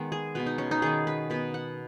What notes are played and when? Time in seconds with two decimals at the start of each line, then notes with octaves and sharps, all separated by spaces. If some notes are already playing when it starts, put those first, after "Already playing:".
Already playing: D#3 G#3 B3
0.12 G#4
0.35 B2 B3 B4
0.46 D#4
0.58 C#4
0.71 D#4
0.82 D#3 B3 G#4
1.07 B4
1.30 B2 B3 B4
1.54 F#5